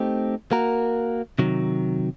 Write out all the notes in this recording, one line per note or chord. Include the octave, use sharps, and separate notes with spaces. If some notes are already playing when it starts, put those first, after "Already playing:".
Already playing: A3 C4 D#4 G4
A#3 F#4 A#4
C3 D#3 F#3